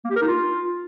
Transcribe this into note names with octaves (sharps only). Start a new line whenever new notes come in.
A#3
G4
A#4
D#4
F4